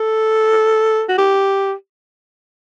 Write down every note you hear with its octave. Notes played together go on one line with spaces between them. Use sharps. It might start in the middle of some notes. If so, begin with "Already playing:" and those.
Already playing: A4
F#4
G4